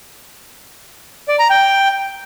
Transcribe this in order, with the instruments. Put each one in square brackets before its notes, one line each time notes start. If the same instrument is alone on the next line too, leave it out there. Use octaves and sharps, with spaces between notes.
[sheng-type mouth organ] D5
A#5
G5